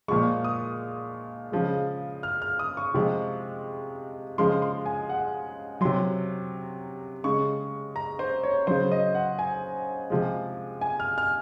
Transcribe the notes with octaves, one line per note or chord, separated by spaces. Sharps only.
A#2 F3 G#3 C#6
D#6
C#3 F3 G#3
F6
F6
D#6
C#6
C3 F3 G#3
C#3 F3 G#3 C6
C6
G#5
F#5
C3 F#3 C6
C#3 G#3 C#6
A#5
C5
C#5
C#3 F#3 C5
D#5
F#5
G#5
C3 F3 G#3
G#5
F6
F6